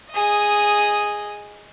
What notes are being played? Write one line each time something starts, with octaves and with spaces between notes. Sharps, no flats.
G#4 D#5